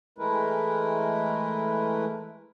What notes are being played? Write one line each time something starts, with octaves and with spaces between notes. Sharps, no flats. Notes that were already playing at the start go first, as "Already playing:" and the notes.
E3 G#3 A3 E4 A#4 B4